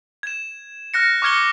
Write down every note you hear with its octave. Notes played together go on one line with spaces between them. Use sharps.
G#6 E7
F6 F#6 A#6 C#7
C#6 D6 F6 G#6 C#7 G7